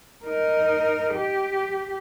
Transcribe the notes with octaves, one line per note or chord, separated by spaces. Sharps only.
D#4 A#4
G4